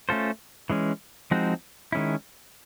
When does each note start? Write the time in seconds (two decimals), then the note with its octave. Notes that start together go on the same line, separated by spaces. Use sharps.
0.09 A3 C#4 F4 A4 C5
0.70 E3 G#3 C#4
1.31 F3 G#3 C4 D#4 F#4
1.92 D#3 G#3 C#4 E4